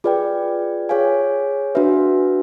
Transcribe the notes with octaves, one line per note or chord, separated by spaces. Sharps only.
F4 G#4 B4 D5 G5
G#4 C#5 F5 G#5
D4 F#4 B4 E5